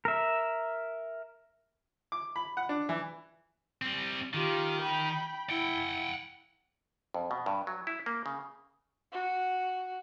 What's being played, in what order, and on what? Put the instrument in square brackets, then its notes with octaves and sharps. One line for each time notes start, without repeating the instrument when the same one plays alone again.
[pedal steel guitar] A#4 E5
[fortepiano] D6
B5
F#5
D4
E3
[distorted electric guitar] G3 C4
[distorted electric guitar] D#3 [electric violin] F4 G4
[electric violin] G5 B5
[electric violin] E4 [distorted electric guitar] F#5 G5
[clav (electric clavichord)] F2
B2
G2
F#3
E4
A#3
C#3
[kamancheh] F#4